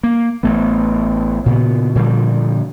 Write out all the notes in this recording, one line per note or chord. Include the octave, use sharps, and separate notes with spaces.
A#3
A1 A3 B3
A#2 C#3 B3
A#2 D3 F3 G3